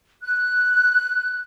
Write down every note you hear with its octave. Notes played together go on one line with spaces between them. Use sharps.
F#6